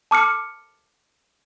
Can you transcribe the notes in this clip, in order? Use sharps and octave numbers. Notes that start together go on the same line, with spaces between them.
A5 D6 F6 C#7